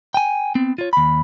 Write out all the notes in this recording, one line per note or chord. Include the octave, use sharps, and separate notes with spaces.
G5 G#5
B3 C4
F4 C#5
D#2 B5